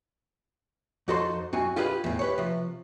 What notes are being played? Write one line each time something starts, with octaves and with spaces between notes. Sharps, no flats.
F2 D#4 F#4 A4 C5 C6
F#2 C4 F#4 G#5
F4 G4 G#4 B4 E5 F5
E2 A2
G4 B4 C#5
C3 F3